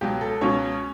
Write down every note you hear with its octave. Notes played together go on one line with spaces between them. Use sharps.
C#2 B2 F#3 G4
A4
C#2 B2 F#3 C#4 C#5